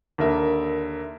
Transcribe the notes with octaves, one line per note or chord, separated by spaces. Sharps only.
D#2 D3 A#4 E5